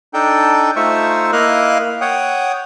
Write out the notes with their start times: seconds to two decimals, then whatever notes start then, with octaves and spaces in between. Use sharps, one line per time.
0.14 D4 D#4 A4 G5
0.76 A3 D#4 F4 C5 E5 C#6
1.33 A#3 E4 A#4 D#5 F5 F#6
2.01 C#5 F#5 G5 D#6